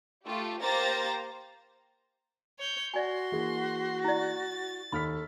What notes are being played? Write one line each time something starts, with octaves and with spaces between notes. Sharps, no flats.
A3 F4 G4
A#3 G4 C5 A#5 A6 A#6
C#5 G6
F#4 D5 G#5 C6
E3 A#3 G#4
E4 D5 A6
D#2 A4 B5 F6 B6